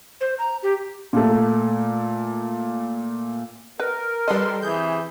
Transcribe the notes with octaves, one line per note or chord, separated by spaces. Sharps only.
C5
A#5
G4
A#2 A3
A#4 B4
G3 A4 B4 D#5 C6
C3 E3 G#4 G6